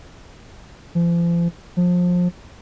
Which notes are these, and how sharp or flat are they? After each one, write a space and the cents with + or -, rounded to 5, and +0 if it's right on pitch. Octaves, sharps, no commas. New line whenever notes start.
F3 -40
F3 +25